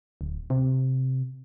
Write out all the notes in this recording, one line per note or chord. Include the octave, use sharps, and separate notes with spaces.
D1
C3